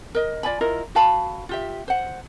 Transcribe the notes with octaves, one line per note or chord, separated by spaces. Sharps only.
A#4 D#5
F4 D5 G#5 B5
E4 F4 A#4 D#5
F#4 F5 A5 B5
F4 G4 E5
C5 F#5